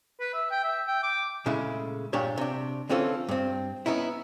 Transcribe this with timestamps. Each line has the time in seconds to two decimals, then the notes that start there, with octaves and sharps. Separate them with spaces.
0.20 B4
0.33 E5
0.51 G5
0.64 E5
0.87 G5
1.03 D6
1.46 A#2 C#3 G#3 A3 E4
2.13 G2 A#2 D4 G4 C#5
2.38 C3 D4
2.89 D3 E3 C4 C#4 F4 A4
3.29 G2 C4
3.86 B3 C#4 D#4 E4